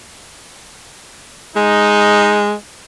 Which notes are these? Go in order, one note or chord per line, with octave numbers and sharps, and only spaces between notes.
G#3 D#4